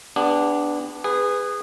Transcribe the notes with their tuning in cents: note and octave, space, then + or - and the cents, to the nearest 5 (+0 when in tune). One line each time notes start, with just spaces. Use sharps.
B3 +10 D4 +0 G#4 -45
G#4 -20 B4 +10